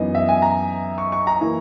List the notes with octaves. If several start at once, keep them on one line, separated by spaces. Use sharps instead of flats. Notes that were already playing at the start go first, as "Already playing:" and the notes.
Already playing: F#2 E3 B3 D#4 D#5
E5
G#5
A#5
C#6
C#6
A#5
E3 A#3 E4